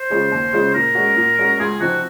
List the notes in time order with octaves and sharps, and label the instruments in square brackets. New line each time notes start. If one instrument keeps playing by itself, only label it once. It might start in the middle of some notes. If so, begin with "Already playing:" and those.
Already playing: [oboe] C5
[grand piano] C#3 G#3 C#4 F4
D#2
C#3 G#3 C#4 F4
[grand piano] A#2 [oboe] A#4
[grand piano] G#3 C#4 F#4
A#2
G#3 C#4 F#4
[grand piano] C#2 [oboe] G#4
[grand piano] C3 F3 C4 D#4 [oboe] F#4